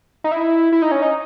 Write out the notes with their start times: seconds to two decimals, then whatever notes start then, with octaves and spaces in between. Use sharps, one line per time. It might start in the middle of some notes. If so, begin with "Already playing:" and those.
0.24 D#4
0.32 E4
0.72 E4
0.82 D#4
0.91 C#4
1.02 D#4